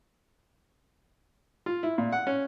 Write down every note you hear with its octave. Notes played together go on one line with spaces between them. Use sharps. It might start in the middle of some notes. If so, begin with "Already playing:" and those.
F4
E4
A#2
F#5
C#4